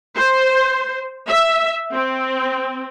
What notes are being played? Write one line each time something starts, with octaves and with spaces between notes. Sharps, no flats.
C5
E5
C4